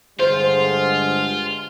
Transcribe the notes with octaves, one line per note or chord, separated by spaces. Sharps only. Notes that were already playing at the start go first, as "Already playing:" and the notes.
G2 D3 G#3 F4 C5